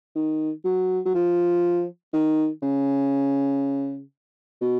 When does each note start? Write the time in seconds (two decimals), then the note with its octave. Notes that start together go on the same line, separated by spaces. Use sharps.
0.16 D#3
0.64 F#3
1.06 F#3
1.15 F3
2.13 D#3
2.62 C#3
4.61 B2